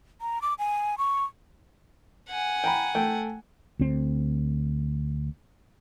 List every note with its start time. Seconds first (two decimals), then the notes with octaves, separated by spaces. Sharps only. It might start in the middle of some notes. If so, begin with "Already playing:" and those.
0.21 A#5
0.42 D6
0.59 G#5
0.98 C#6
2.29 F#5 G#5
2.64 G5 A#5 B5
2.95 A3 G5
3.79 D2 C4